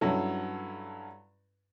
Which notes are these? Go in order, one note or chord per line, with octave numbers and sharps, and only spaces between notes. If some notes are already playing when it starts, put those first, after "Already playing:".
G2 F#3 C#4 E4 A4